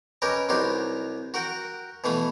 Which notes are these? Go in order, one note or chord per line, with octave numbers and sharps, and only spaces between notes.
C#4 G4 A#4 B4 D#5
C2 F#3 D#4 G4 B4 C6
F#4 A#4 F#5 G5
B2 E3 A3 F5 B5